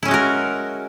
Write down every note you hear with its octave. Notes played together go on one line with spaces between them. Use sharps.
G#3 C#4 E4 F#4 A#4